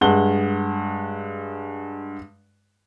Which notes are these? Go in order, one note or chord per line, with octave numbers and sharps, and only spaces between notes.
G2 G#3 F#5 G7